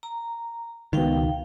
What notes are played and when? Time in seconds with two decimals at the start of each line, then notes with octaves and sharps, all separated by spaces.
0.03 A#5
0.93 C#2 B2 D#3 F5 G5